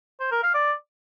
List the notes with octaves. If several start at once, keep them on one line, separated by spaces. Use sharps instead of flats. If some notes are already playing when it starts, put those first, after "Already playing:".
C5
A#4
F5
D5